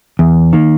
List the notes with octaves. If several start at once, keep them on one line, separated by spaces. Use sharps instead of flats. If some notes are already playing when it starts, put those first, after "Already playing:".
E2
D#3 A#3